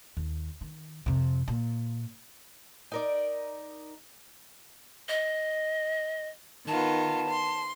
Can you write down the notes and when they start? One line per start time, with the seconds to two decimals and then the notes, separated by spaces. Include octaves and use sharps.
0.17 D#2
0.61 D#3
1.06 F2 C3
1.48 A#2
2.92 D#4 A#4 D5
5.09 D#5
6.68 D#3 B3 F4 A5
7.30 C6